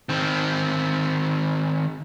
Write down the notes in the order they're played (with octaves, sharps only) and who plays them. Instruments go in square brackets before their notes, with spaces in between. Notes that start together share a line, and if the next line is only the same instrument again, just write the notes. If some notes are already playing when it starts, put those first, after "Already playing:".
[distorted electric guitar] D#3 C4